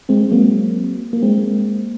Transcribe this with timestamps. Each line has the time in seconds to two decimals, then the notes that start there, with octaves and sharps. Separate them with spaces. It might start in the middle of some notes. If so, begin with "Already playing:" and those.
0.09 G#3 C4
0.23 G#3
0.32 F#3 A#3
1.13 A#3
1.23 G#3 C4